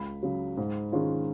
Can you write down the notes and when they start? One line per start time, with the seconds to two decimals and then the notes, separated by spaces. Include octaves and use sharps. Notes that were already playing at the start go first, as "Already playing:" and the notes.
Already playing: C#2 B5
0.23 C#3 F#3
0.57 G#2
0.92 D#3 G#3 C#4 F4